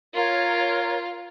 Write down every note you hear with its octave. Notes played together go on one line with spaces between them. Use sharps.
F4 A#4 C#5